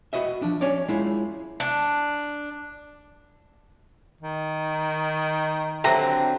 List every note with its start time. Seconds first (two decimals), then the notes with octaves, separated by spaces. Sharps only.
0.13 F#4 B4 D#5 E5
0.42 F3 D4
0.61 C#4 C#5 D5
0.88 G#3 E4 F4
1.60 D4
4.21 D#3
5.84 D3 F#3 C4 G4 E5 A#5